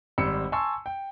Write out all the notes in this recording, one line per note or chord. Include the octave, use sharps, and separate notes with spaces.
G#1 G3 C4 B5 E6 C#7
G#5 A5 C6 C#6 E6
G5